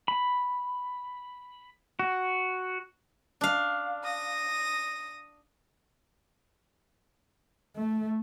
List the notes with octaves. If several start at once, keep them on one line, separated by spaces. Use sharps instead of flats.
B5
F#4
D4 F5
D#6 A#6
A3